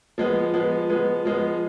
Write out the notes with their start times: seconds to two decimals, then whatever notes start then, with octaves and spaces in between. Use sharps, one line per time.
0.18 F3 G#3 B3
0.54 F3 G#3 B3
0.90 F3 G#3 B3
1.25 F3 G#3 B3